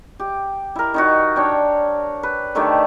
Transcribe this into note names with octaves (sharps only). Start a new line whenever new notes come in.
G4
E4 A#4
D#3 D#4 F#4
D4 C#5 G5
B4
D3 D#3 A3 G4